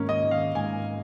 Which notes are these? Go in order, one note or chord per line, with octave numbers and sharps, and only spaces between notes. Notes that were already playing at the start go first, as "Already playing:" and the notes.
Already playing: G#2 D#3 A#3 C#4
D#5
D#3
F5
G#2 G#5